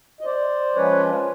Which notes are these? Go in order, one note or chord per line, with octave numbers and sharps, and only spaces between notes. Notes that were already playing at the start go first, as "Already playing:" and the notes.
D#5
C5 D5
F3 G#3 C#4 F4 B4 C#5